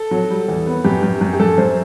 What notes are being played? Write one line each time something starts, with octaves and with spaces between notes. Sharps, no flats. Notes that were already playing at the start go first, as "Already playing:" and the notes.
Already playing: A4
F#3
G3
E2
B3
F#2 G4
F#2
F#2
G4
F#2 A4
F#2 C5